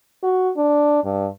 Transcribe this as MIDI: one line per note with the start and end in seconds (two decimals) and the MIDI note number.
0.23 0.51 66
0.57 1.04 62
1.04 1.26 43